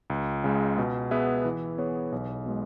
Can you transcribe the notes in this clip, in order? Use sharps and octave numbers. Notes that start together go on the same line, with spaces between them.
C#2
C#3 G#3
B2
B3 G#4 B4 E5
E3
B3 G#4 C#5
B1
B2 G#3